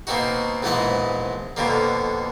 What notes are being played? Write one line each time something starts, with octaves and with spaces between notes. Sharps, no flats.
B2 A#3 C4 D#4 F#4
A#1 G#2 E3 G#3 B3 D#5
F2 B2 D3 A#3